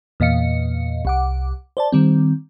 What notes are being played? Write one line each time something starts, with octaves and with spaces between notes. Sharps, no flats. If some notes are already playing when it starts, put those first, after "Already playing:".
E2 A#2 D#5 F5 C#7
C2 F#5 D6
C5 D5 A5
D#3 G3 C4